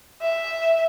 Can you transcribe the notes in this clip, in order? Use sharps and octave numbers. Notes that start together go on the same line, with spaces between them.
E5